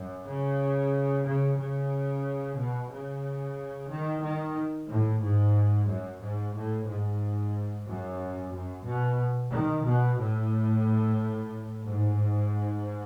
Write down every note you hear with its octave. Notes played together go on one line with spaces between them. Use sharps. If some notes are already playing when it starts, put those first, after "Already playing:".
Already playing: F#2
C#3
C#3
C#3
B2
C#3
D#3
D#3
A2
G#2
F#2
G#2
A2
G#2
F#2
F#2
B2
D#3
B2
A2
G#2